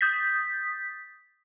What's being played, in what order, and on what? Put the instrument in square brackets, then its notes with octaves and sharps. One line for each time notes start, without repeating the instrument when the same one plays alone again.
[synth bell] D#6 G6 A6 B6